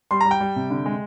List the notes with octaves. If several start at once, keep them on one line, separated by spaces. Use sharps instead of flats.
G3 C6
A#5
G3
G5
G3
C3
D3
G#3